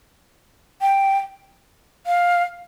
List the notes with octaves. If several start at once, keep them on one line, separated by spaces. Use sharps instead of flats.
G5
F5